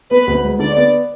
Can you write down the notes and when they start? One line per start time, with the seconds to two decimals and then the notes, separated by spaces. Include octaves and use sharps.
0.11 B3 B4
0.27 D2
0.44 G#3
0.59 D3 D5
0.77 B3